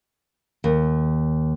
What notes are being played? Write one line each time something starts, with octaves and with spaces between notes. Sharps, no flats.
D#2